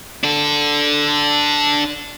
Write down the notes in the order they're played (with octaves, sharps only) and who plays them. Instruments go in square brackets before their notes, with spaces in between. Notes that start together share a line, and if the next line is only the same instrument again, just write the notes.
[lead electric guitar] D4 A4